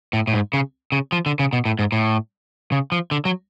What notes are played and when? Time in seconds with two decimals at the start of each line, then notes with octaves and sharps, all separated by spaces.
0.13 A2
0.27 A2
0.33 G#2
0.53 C#3
0.92 C#3
1.12 F3
1.26 D3
1.39 C#3
1.53 B2
1.65 A2
1.79 G#2
1.92 A2
2.72 C#3
2.92 F3
3.11 D3
3.25 F#3